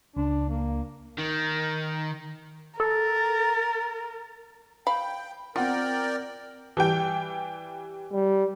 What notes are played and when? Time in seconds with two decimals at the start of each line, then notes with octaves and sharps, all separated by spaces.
0.17 C#2 D4
0.50 A#3
1.18 D#3
2.80 A4 A#4 A6
4.87 F5 G5 B5
5.56 C4 F4 A#4 D5 F#5 G5
6.77 E3 G3 G5
8.13 G3